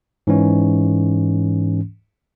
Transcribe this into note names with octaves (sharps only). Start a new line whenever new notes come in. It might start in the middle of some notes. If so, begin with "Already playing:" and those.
G#2 E3 C#4